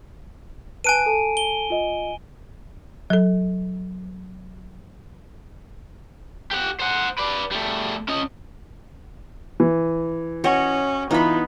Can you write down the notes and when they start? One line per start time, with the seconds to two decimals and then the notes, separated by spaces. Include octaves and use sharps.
0.84 B4 G#5 A5 F#6 D7 D#7
1.06 A4 A5
1.37 G7
1.70 F4 D#5
3.10 F#3 A4
6.51 G4 F#5
6.80 C5 F#5
7.18 B4 D5
7.51 G3 A3
8.08 C#4 D#5
9.60 E3
10.44 C#4 F#4 C#5 D#5
11.11 E3 B3 D#4 F4 B5